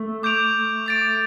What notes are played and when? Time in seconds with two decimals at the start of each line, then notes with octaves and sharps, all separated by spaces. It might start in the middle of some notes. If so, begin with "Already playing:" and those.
Already playing: A3
0.23 D6 G6 D7 F7
0.86 D6 A6 D7